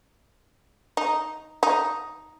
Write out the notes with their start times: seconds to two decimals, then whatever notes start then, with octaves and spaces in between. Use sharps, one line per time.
0.97 D#4
1.63 D#4